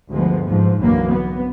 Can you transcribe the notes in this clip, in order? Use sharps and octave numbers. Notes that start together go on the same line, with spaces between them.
D2 G2 F3 G#3 B3
G#2 F3
B1 F#2 D3 E3 F#3 A#3
B3